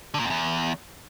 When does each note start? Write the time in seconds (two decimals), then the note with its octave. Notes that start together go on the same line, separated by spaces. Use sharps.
0.14 D3
0.19 A#2
0.25 F2
0.30 E2